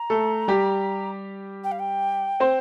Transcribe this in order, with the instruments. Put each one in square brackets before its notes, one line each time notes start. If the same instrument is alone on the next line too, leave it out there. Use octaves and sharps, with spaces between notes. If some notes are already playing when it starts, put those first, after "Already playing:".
Already playing: [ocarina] A#5
[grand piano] A3 A4
G3 G4
[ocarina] G5
F5
G5
[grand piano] C4 C5